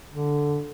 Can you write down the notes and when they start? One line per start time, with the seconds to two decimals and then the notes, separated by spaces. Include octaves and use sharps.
0.13 D3